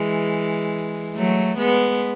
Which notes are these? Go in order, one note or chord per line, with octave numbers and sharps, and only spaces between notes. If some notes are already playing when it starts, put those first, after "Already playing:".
Already playing: E3 G#3
F#3 A3
G#3 B3